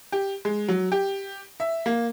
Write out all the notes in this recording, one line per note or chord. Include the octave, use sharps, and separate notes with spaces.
G4
G#3
F#3
G4
E5
A#3